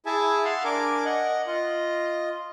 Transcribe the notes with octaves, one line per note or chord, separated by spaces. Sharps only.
E4 G#4 E5 G#5 A5
F5 F#5 C6
D4 A#4 G#5 D6
D#5 F#5
F4 D#5